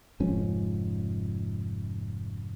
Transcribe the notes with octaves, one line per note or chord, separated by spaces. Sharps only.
F1 G#2 F3 C#4